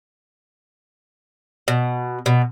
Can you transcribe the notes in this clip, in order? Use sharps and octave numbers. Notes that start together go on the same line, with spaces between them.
B2
B2